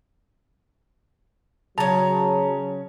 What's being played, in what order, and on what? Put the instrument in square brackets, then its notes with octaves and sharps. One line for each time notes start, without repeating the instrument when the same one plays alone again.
[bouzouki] C#3 C#4 [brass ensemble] F#3 [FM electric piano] A5 [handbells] A#5